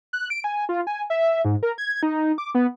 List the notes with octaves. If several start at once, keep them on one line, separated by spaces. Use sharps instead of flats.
F#6
D7
G#5
F4
G#5
E5
G#2
A#4
G#6
D#4
D6
B3